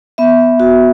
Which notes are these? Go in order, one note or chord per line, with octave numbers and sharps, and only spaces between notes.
B3 E5
F#4